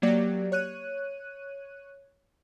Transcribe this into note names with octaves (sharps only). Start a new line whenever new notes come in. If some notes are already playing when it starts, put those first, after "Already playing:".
F#3 A#3 G4 D5
C#5 F#6 D#7